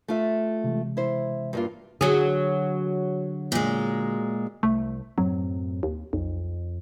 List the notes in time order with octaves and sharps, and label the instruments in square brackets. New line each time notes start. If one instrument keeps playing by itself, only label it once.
[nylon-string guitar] A3 F4 E5
[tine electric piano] C3 E3 G#3
[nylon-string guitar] E4 C5
G2 A#3 F4
[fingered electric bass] D3 [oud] F#3 G#4
[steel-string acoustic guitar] A#2 G#3
[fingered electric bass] C2 [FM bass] A3
[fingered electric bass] F#2 A2 C4 [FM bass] F#3
[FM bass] D#2
[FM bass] B1 [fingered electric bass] F2